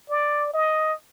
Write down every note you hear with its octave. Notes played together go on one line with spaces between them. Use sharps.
D5
D#5